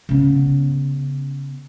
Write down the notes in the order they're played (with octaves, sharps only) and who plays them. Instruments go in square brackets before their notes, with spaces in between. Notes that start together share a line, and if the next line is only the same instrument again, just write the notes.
[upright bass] C#3 B3